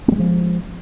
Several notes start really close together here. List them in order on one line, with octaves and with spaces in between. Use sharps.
A#3 G3 G#3 F3